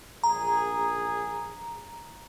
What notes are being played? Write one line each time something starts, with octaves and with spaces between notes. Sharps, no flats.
A#1 G#4 A#5